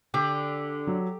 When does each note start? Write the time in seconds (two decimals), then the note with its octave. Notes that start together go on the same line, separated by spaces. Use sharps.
0.14 D3 G4
0.87 F#3